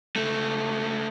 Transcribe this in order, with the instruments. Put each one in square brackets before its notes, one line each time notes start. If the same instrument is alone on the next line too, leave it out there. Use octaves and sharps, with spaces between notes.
[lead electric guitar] C#2 A3